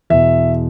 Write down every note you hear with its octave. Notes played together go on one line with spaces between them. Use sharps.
E2 B2 E5